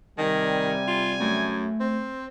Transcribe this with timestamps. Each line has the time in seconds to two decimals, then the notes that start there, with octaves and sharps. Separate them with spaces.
0.19 C3 D#3 G3 G#5
0.88 F4
1.20 F#2 A3
1.80 C4